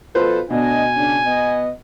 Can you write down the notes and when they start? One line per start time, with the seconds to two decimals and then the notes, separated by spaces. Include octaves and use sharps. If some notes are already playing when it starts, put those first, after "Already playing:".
0.15 B2 F3 F4 A4 B4 C5
0.50 D2 B2 D4 D#5 G#5
0.96 C#3 D4
1.26 B3 D#5